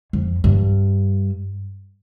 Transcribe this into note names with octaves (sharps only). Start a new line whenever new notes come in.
F2
G2